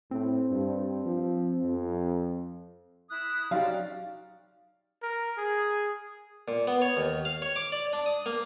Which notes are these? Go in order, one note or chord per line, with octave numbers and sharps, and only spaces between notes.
A2 C4
G2
F3
F2
E4 D#6 F#6
F#3 C#4 D#4 G4 D5 F5
A#4
G#4
A#2
B3
C#5
D#2
F5
C#5
D6
D5
D4
D#6
A#3